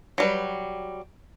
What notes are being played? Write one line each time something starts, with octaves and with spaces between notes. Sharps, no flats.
F#3 G3 B4